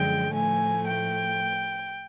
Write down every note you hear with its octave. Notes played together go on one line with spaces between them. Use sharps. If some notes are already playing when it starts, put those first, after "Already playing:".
Already playing: F#2 D3 F3 G#3 G5
A2 F3 A3 G#5
G5